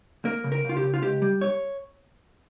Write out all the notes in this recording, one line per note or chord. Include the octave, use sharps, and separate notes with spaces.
A#3 A#4
C#3
A#4
C#3 F4
G4
C#3
F4
C#2 G4
G3
C#5